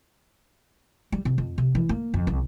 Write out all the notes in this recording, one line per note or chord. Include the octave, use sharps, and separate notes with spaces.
G3
C3
F2
C3
E3
A#3
F2
C2